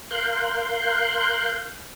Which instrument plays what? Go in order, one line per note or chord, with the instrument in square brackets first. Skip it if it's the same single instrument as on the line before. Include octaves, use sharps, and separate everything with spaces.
[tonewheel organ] A#4 F5 C6 F#6 G6